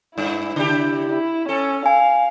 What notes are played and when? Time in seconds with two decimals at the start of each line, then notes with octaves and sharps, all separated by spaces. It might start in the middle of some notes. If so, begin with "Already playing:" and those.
0.18 G2 E4
0.56 C#3 D4 G4
1.09 E4
1.49 C#4 A4
1.86 F5 G#5